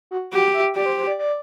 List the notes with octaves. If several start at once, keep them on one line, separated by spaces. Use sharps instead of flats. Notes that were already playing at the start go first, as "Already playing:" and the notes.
F#4
F#4 G4
E5
G4 D5
C5
C5
D5
D5